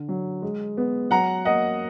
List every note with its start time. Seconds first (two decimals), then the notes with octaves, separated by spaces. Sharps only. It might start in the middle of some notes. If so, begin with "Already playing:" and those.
Already playing: D3
0.09 F#3
0.42 G#3
0.77 B3
1.11 F#3 F#5 A#5
1.45 A#3 D#5 F#5